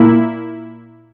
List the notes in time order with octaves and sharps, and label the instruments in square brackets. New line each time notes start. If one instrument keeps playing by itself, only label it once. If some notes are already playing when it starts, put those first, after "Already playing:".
Already playing: [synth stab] A#2 A#3 E4